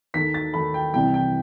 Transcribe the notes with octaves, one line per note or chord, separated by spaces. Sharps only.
D#2 D#3 A3 B6
A6
D#2 D#3 A3 B5
G5
C2 C3 E3 G3 G5
G5